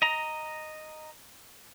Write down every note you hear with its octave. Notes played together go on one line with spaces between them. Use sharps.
D#5 A#5